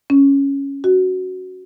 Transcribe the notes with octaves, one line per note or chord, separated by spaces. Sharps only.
C#4
F#4